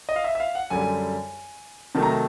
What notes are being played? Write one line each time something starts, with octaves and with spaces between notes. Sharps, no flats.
D#5
F5
E5
E5
F5
F#5
F#2 D3 G3 G#5
C3 D#3 F#3 A3 A5
A#5
A5